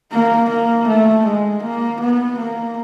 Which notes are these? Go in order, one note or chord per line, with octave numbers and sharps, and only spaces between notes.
A#3
A#3
A3
G#3
A#3
B3
A#3